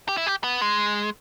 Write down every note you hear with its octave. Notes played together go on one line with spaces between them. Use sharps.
G4
E4
G4
B3
G#3